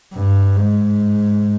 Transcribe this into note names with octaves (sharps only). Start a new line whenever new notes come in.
G2
G#2